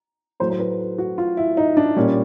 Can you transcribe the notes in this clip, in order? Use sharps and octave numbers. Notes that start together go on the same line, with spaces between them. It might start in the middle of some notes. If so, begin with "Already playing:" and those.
A2 F#3 A3 C5
C5
B4
F#4
F4
E4
D#4
D4
A#2 G3 C#4